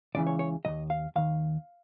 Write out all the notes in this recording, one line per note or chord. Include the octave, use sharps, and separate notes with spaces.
C#2 C#3 E3 D5
C#5
C#5
D#2 D#3 D#5
F5
D#2 D#3 F5